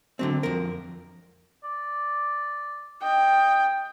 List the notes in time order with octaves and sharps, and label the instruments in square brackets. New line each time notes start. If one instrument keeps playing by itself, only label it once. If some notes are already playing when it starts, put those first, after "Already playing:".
[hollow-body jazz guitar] D3 F#3 C4
F2 A#4
[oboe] D5
[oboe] D#5 [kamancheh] G5